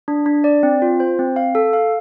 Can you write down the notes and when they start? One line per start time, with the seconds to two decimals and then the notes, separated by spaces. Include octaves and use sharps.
0.08 D4
0.26 D4
0.44 D5
0.63 C4
0.82 F4
1.00 C5
1.19 C4
1.36 F5
1.55 A4
1.73 F5